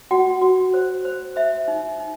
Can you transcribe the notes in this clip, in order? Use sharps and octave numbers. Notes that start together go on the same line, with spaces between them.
F#4 F#5
F#4
C5
C5
C5 E5
D#4
D#4